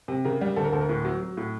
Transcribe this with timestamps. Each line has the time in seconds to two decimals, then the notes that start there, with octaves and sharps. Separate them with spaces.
0.08 C3
0.25 C#3 A#4
0.41 G3
0.56 D2 A4
0.65 A#4
0.72 D2 A4
0.81 A#4
0.89 A2
1.05 F#3
1.22 F#3
1.37 A2